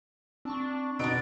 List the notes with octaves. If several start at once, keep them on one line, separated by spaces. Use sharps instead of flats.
C4 D4 A5 C#6
B2 D4 D#4 D5 E6 F#6 D7